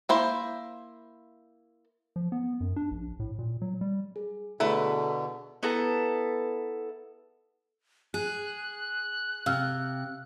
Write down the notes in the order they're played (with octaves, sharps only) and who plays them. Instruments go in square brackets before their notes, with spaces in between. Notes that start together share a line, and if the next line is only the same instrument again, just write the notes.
[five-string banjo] A#3 E4 C5
[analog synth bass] F3
B3
F#2
D4
A#1
A2
A#2
F#3
G3
[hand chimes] G#4
[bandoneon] B2 D3 [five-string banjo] A3 E4 B4 [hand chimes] G#4 A4 A#5
[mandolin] B3 E4 A4 A#5
[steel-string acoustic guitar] G#4 [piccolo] F#6
[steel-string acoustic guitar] C3 [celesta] F5 E6 F6